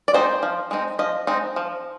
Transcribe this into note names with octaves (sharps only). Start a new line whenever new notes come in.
D5
G#3 C4 D#4 C5
F3
G#3 C4 D#4
F3 D#5
G#3 C4 D#4
F3